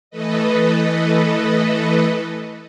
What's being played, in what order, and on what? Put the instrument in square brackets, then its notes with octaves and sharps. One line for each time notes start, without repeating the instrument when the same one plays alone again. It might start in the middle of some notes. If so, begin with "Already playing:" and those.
[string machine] E3 A3 A4 B4 D#5